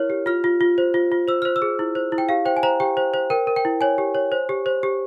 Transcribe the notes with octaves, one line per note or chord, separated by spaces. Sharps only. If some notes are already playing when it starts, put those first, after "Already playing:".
Already playing: E4 A#4 C#5 F6
G4
F4 F6
F4
F4
C5
F4
F4
C5 E6
C5 F6
E6
G#4
E4
C5
E4
G5
G4 F5
C5 G5
G#5
C5 A#5
G4 G5
C5
C5
A#4 G5
A#4
G5
E4
C#5 G#5
G4
C#5
C5
G4
C5
G4